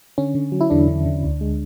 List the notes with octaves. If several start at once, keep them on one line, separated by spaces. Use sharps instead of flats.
D3 C#4
D3
F#3
E4
E2 D3 D4
D3
D3
D2
G#3